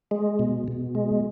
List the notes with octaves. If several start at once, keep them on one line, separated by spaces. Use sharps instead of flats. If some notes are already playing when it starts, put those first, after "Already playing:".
G#3
B2
B2
G#3